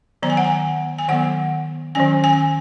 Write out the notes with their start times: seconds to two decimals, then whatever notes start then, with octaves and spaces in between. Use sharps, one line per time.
0.23 D#3 F#3 B3 A#5
0.30 G#5
0.37 F#5
0.45 G#5
0.99 G#5
1.08 D#3 F#3 B3 F#5
1.95 D#3 F#3 C#4 G#5
2.24 G#5